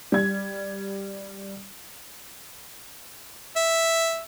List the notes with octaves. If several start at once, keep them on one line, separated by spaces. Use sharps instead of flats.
G3 G#6
E5